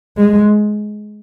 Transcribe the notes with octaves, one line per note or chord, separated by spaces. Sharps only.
G#3